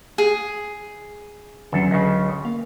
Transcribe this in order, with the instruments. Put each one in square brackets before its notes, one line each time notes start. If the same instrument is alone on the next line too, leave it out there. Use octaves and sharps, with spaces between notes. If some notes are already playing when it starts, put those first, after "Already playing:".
[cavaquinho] G#4
[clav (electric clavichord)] E2 A4 [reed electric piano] D3 F#3 C#4
[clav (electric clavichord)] C#2 C#3
[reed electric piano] A#3 [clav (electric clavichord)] F5